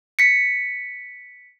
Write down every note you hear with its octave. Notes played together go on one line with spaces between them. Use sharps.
B6 C#7